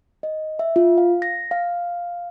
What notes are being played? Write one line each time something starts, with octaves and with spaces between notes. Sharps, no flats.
D#5
E5
F4
F5
A#6
F5